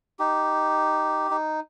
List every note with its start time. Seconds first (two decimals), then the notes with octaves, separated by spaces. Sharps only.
0.19 D#4 G4
1.31 D#4